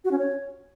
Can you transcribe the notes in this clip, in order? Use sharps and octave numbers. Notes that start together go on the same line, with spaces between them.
F#4
C#4
C#5